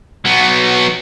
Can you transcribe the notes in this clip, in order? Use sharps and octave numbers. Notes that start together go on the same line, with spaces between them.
F#3 B3